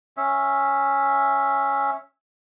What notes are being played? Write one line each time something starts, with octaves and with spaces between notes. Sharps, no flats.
C#4 E5